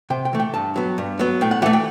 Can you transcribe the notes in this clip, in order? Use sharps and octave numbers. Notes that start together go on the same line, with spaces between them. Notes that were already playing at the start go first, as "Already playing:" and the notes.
C3 G5
G5
E3 A3
G5
G2 A5
F#3 B3
G2
F#3 B3
A2 G5
F#5
E3 A3 F#5
G5